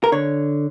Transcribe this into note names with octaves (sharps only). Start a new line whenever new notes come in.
A#4
D3 C#5